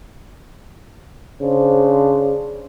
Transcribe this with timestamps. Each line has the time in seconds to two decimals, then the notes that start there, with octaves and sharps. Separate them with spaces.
1.41 C#3 D4 C5